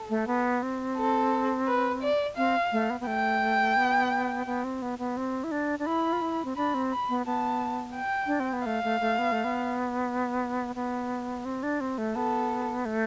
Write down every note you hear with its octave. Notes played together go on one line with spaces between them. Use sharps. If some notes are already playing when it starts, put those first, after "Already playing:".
Already playing: A4
A3
B3
C4
A4
B4
D5
C4 F5
A3
B3
B3
A3 G5
B3
B3
C4
B3
B3
C4
E4
D4
D4
E4 B5
F4
E4
C4
D4 B5
C4
B5
B3
B3 A5
G5
D4
C4
B3
A3 F5
A3
A3
B3
A3
B3
B3
C4
D4
C4
A3
B3 A4
A3